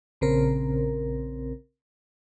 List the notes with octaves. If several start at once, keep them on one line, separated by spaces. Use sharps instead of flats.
A#1 C#3 C4 A#4